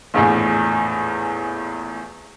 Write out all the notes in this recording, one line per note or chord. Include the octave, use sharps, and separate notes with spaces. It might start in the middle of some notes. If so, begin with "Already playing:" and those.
A#1 E2 A2